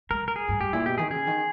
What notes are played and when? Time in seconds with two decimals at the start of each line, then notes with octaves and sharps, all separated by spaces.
0.10 G#3 A#4
0.23 B2
0.28 A#4
0.36 G#4
0.49 G2
0.60 G2 G4
0.73 A#2 E4
0.86 B2 G4
0.98 D#3 G#4
1.11 C#3 G#4
1.27 D#3